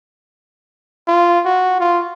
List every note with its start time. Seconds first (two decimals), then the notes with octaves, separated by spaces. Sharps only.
1.08 F4
1.45 F#4
1.80 F4